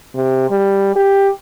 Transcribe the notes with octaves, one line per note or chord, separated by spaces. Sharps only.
C3
G3
G4